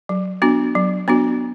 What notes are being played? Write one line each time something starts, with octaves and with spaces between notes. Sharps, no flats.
F#3
B3 D4 F#4
F#3
B3 D4 F#4